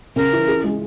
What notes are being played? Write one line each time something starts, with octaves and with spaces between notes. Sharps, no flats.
C#3 A#4
E3
G#4
G#3